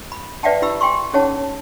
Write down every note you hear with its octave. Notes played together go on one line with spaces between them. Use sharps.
B5
B4 D5 E5 F#5 G5 A5
E4 G4 B5 E6
G5 G#5 C6 C#6
C#4 D#4 G#4 C#5 F#5 A5